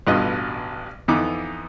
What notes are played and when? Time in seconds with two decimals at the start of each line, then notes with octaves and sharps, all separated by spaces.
0.07 A1 G2 B2 F4 B4 D#5
1.08 F2 E3 B3 D#4 D6